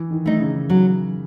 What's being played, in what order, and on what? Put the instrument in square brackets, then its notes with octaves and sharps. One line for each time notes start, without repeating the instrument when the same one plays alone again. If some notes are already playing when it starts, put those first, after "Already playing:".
Already playing: [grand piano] E3
D#3
[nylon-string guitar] A3 D#4
[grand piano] C#3
[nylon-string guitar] F#3